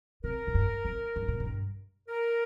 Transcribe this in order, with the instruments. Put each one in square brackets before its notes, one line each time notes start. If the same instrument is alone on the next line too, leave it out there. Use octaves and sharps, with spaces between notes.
[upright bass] C3 [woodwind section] A#4
[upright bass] A#2
G2
F2
G2
A#2
G2
[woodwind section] A#4